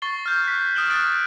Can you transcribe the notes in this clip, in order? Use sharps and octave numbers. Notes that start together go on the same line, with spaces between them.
C#6 A6 C7 G7
F6 G6
F#6 B6
D#6 F6 D7 E7 F#7 G7
F6 F#6 A6 D7 F#7